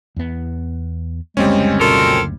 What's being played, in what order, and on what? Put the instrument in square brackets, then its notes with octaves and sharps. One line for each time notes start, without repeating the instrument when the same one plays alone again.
[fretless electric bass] E2 B3
[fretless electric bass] F#1 D2 A#3 [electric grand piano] G3 C4 C#4 [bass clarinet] G#3
[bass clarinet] B2 [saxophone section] F4 A4 A#4